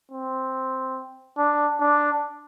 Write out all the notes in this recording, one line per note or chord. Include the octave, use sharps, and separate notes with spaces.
C4
D4
D4